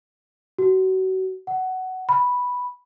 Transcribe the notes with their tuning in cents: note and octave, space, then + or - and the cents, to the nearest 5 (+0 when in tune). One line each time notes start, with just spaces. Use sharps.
F#4 +30
F#5 +15
B5 -5